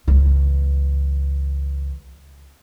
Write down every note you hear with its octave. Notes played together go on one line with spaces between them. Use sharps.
C#2 E3